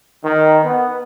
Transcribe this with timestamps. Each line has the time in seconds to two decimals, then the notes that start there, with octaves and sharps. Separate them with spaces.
0.24 D#3
0.65 B3